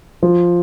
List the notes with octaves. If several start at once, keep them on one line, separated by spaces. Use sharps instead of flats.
F3